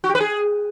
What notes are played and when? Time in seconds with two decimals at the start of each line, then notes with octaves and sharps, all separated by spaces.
0.04 F#4
0.09 G4
0.15 B4
0.20 G#4